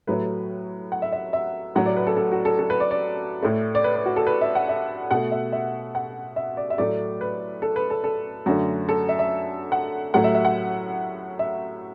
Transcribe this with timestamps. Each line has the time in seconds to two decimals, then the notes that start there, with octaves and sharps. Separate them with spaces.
0.07 A2 F#3 A3 B4
0.92 F#5
1.02 E5
1.13 E5
1.33 E5
1.75 A2 F#3 A3 F#5
1.86 D5
1.97 B4
2.07 A4
2.17 A4
2.32 F#4
2.45 A4
2.59 A4
2.70 B4
2.80 D5
2.91 D5
3.43 A2 A3
3.75 D5
3.84 B4
3.95 B4
4.06 F#4
4.16 A4
4.27 B4
4.41 E5
4.55 F#5
4.69 E5
5.11 B2 A3 F#5
5.32 E5
5.52 E5
5.95 F#5
6.36 E5
6.57 D5
6.70 E5
6.78 A2 F#3 A3 D5
7.21 B4
7.62 A4
7.76 B4
7.90 A4
8.04 A4
8.46 F#2 D3 A3 F#4
8.89 A4
9.09 E5
9.19 E5
9.72 F#5
10.14 A2 F#3 A3 F#5
10.24 E5
10.35 E5
10.45 F#5
11.39 E5